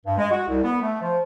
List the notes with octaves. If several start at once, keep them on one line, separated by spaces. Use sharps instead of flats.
G2
G#3
F#4
C2
B3
A3
F3